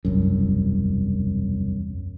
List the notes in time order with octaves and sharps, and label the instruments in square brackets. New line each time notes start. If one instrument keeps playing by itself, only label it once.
[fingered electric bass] E1 C2 F#2